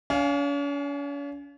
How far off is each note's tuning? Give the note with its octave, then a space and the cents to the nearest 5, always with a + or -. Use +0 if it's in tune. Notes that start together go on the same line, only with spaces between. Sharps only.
C#4 +45 F5 +0 G#5 +0